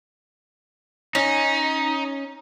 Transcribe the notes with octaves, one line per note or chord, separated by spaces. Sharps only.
C#4 D#4